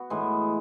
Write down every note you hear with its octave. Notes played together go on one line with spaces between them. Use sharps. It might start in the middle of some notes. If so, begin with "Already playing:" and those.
Already playing: B3 F#4
A2 E3 G#3